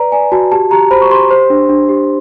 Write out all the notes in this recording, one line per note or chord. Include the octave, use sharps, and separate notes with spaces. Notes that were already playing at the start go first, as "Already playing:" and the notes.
Already playing: B4 D5 A#5
D5 G#5
F#4 A5
G4 A5
G4 A#5
C5 B5
C#6
G4 C6
C5
D4
D4
G4